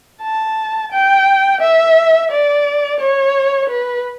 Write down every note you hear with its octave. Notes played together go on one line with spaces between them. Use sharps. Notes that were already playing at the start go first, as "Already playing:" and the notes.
A5
G5
E5
D5
C#5
B4